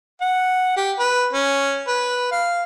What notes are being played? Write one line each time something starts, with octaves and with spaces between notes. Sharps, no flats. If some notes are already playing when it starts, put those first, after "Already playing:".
F#5
G4
B4
C#4
B4
F5